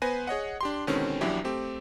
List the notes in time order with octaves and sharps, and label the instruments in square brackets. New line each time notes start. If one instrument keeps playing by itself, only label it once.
[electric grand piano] B3 B4 C5 G#5 A#6
G#4 C#5 D#5 F#5
D4 G4 C6
B2 D3 D#3 G#3 C4 C#4
A#1 E2 F#3 D4 E4 G4
A3 C4 G4